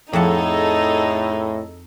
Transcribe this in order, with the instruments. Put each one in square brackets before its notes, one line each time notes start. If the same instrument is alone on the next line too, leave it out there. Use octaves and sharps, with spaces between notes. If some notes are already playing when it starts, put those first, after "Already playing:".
[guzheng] F2 F#5 A5 [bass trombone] A2 [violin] D#4 [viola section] G#4 A4 D#5